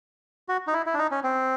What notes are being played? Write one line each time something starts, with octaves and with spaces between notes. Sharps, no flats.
F#4
D#4
E4
E4
D4
D#4
C#4
C4